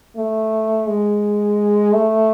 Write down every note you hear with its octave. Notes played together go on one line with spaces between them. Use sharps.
A3
G#3
A3